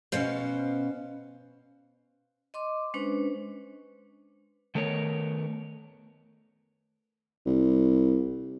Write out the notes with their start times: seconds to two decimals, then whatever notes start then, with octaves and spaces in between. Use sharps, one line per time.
0.12 B2 C#4 C5 F5
2.54 D#5 C6 D6
2.94 G#3 C#4 D4 B4 C5
4.75 D#3 A3 B3 A#4 C#5
7.46 C2